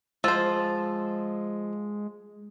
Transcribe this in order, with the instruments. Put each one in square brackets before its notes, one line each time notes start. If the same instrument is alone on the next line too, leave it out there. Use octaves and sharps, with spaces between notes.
[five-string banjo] F3 C5 [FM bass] G#3 [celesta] E6 A6